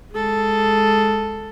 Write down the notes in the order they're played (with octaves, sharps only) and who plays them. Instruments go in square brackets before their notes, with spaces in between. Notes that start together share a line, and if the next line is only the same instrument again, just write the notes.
[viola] G#3 A4